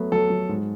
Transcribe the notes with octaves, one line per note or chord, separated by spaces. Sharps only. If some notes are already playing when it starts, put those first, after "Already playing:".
Already playing: F#3 A3 B3
F#3 A4
F#3
G#2